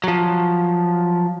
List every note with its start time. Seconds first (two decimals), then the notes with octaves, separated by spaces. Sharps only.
0.04 F3 F#3